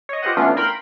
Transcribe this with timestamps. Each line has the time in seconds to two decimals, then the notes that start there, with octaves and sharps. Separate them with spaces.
0.09 C#5 D#5
0.22 F4 G4 B4 C5 D#5 F#5
0.37 E3 A3 B3 C#4 D4 F4
0.57 A#4 G5 B5 C6